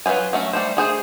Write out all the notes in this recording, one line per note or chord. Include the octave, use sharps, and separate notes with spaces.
F#3 F4 B4 C5 G#5
F#3 A3 C#4
G3 A3 C5
A3 G#4 C5